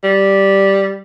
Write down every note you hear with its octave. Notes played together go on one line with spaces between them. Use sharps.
G3